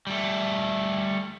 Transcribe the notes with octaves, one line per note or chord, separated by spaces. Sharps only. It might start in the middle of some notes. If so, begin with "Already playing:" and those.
G3 A3